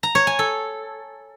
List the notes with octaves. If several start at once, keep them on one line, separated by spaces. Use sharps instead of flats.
A#5
C#5
G#5
A4